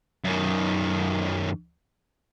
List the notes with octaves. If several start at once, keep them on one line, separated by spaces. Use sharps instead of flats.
F#2 D#3